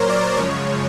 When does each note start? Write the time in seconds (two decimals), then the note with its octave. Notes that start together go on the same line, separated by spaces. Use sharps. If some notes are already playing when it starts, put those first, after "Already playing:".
Already playing: A#2 F#3 A#4 C5 C#5
0.10 D5
0.37 F#2 C#3 F3 G#3 C#5